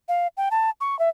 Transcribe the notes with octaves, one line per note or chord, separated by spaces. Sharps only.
F5
G5
A5
C#6
E5